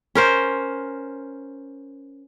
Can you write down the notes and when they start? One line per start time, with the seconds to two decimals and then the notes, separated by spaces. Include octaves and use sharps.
0.15 C#4 A#4 C5